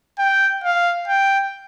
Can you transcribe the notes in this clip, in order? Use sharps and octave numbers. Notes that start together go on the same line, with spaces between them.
G5
F5
G5